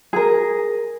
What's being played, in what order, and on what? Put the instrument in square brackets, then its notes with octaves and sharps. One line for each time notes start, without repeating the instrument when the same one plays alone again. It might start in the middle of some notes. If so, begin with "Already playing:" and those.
[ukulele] G#4 A#4